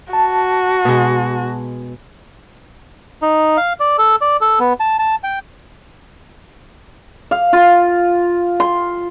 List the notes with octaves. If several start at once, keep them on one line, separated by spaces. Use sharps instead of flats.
F#4 A5
B2 G#3
D#4
F5
D5
A4
D5
A4
B3
A5
A5
G5
F5
F4
C6